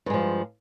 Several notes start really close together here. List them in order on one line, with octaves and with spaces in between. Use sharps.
G2 G#3 F3